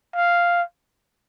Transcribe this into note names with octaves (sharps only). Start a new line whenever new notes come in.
F5